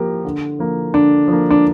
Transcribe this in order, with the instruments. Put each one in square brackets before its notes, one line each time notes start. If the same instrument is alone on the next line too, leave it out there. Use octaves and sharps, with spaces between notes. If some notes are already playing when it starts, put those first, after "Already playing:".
Already playing: [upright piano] F3 A#3 G4 A#4
D3
F3 A#3
[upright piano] D3 [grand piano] D4
[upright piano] F3 A#3
[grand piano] D4